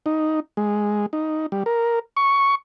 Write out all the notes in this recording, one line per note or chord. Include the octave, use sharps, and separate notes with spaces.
D#4
G#3
D#4
G3
A#4
C#6